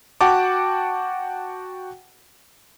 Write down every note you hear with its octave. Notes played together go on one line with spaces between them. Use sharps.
F#4 F#5 G5 A5 D6